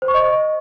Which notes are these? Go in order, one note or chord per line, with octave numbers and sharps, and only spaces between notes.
C5
C#6
D#5